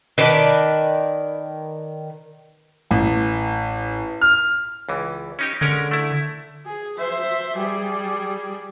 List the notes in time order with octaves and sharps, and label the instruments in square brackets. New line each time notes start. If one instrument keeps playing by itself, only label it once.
[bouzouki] D#3 B4 D5 A5
[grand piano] A1
F6
[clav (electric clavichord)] C#2 E3
C#4 D#4 G4
[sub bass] D3 [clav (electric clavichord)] G#3 C#4 A#4
[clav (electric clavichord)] A3 E4
[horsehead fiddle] G#4
C5 E5
G3 G#4